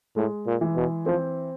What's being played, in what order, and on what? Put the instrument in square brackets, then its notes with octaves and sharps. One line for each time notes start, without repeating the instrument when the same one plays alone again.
[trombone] A2 [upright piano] G#3
[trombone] A#2
[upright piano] E3
[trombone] B2
[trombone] F3 [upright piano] C4